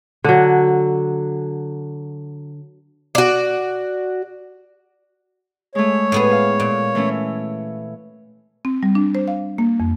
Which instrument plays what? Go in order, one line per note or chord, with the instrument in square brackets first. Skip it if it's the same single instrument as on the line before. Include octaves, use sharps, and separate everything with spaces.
[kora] D3 F#3
[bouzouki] F#4 D5
[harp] G#3 A3 [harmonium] C#5
[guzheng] A2 B3 G#4
[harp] F5
[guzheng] A#2
[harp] E3 A3 C#4
[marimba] C4
G3
D4
C5
F5
A#3
F2